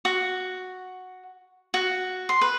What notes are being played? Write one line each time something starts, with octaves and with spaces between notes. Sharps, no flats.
F#4
F#4
C6
B4